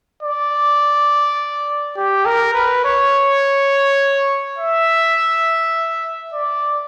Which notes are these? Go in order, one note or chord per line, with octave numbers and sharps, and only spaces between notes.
D5
G4
A#4
B4
C#5
E5
D5